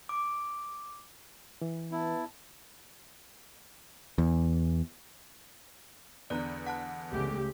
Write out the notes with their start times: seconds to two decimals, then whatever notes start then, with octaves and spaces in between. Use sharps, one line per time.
0.09 D6
1.61 E3
1.92 B3 E4 A5
4.18 E2
6.30 E2 D3 B3 D5 A#5 F#6
6.67 F#5 A5 F#6
7.12 C#2 G#3 A3 G4